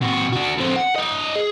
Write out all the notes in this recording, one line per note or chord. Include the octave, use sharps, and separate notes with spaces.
C3 F#4
D4 F#4
D3 C4
F#5
D4 D#5
G#4